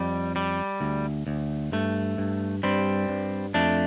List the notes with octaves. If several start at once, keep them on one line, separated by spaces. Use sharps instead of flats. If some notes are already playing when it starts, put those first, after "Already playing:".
Already playing: F2 G3
G3
D2
D2
G2 A3
G2
G2 G3 C4
G2
F2 A3 D4